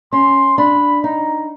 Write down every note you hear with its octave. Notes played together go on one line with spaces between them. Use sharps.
C#4 C6
D4 B5
D#4 A#5